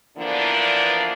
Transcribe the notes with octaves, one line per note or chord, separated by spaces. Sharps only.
D3 E3 F3 A#3 B3 D4